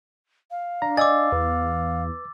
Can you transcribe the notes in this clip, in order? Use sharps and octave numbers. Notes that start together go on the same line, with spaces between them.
F5
D4 A#5
D5 D#5 G#5 D6 E6 A6
E2 B4